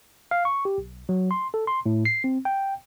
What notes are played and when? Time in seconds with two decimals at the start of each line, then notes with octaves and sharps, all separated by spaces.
0.31 F5
0.45 C#6
0.65 G4
0.78 B1
1.09 F#3
1.31 C6
1.54 A4
1.67 C6
1.86 A2
2.05 C7
2.24 C4
2.45 G5